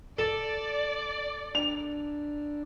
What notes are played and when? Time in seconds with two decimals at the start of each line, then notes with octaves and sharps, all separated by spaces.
0.19 A4 D5
1.55 D4 F7